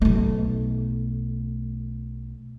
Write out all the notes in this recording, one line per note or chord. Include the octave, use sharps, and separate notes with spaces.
B1 A3